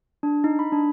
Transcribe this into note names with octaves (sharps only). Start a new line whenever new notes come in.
D4
D#4
B5
D4